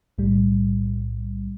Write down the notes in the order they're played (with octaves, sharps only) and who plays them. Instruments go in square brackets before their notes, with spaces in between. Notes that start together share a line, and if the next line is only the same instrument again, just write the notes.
[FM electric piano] B1 A2 G3